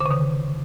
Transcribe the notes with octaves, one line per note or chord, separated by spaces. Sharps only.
D3
C#3
D#3